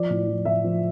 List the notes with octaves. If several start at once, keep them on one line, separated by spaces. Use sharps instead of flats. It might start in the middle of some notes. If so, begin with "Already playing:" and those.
Already playing: F3 D5
A2
F3
A2 E5
F3